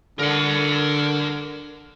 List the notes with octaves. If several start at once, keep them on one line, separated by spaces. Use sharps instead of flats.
D3 A#4 F#5